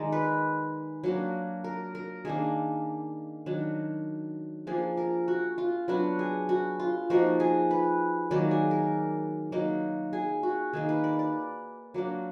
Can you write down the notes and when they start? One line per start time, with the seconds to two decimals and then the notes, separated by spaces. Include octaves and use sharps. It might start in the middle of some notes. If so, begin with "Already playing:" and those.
Already playing: D#3 G#3 D#4 D5
0.12 B4
1.04 F#3 A#3 D4
1.64 A#4
1.95 A#4
2.25 D#3 A#3 D4 G#4
3.46 D#3 F#3 D4
4.67 F3 A#3 D4 G#4
4.97 A#4
5.28 F#4
5.58 F4
5.88 F#3 B3 D4 F#4
6.19 G#4
6.49 F#4
6.80 F4
7.10 F3 A#3 D#4 F#4
7.40 G#4
7.71 B4
8.31 D#3 F#3 A#3 D5
8.51 G#4
8.71 A#4
9.52 F#3 A#3 D#4
10.13 G#4
10.43 F#4
10.73 D#3 A#3 D#4 G#4
10.89 B4
11.04 D5
11.19 D5
11.94 F#3 A#3 D4